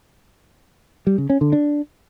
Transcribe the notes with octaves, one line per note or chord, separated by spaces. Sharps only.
G3
C#3
C#4
D3
D4